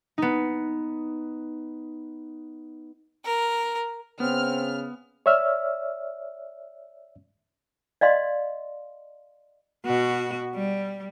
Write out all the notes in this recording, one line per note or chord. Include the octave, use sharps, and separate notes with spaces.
B3 D#4
A#4
C#3 B3 C4 F6
C#5 D5 E5 E6 F6
D5 D#5 F5 C6
B2 F#4
G3